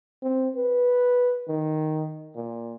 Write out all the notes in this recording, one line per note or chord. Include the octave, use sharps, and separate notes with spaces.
C4
B4
D#3
A#2